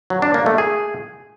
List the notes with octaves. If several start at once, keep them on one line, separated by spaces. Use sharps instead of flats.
F#3
D4
A#3
A3
G#4